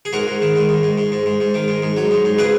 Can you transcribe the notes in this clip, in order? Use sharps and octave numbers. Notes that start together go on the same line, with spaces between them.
G#4
G#2 F#4 A#4
G#2
D#3
G#2
G#2
G#2
G#2
G#2
G#2
G#2
D#3
G#2
G#2
F#3
G#2
G#2
C#3 G#4 B4